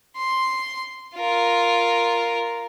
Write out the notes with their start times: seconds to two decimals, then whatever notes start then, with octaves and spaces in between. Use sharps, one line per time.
0.17 C6
1.16 F4 A#4